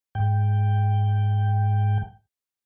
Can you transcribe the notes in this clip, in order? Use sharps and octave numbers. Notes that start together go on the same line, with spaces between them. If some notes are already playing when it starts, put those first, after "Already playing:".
G#2 G5